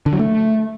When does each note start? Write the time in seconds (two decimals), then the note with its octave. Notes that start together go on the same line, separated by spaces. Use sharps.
0.06 D3
0.13 F#3
0.19 A3